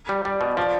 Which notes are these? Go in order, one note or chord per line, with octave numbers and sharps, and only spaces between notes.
G3
G3 D5
B2
F3 D5